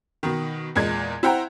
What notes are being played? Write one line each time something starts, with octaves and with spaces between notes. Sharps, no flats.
B2 D#3
E2 A#2 G#3 G#6
E4 C5 F#5 G5 A#5